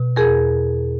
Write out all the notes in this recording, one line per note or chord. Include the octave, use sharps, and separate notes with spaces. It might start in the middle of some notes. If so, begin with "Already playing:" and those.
Already playing: B2
E2 G#4 A#4